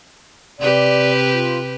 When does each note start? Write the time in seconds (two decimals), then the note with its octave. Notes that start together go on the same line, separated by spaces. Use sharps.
0.59 C3 G4 B4 D5
1.33 F4